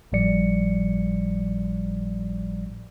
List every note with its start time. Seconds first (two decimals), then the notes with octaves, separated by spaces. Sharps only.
0.12 G#1 A2 F3 G3 D5 C#7